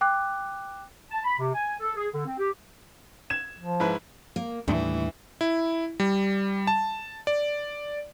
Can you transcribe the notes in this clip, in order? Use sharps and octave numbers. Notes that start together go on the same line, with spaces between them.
G5 D6 F#6
A5
B5
C3
G#5
A4
G#4
D3
C4
G4
G#6 E7
F3
G#2 E4 B4
A#3
D#2 A2 E3 G3 D4
E4
G3
A5
D5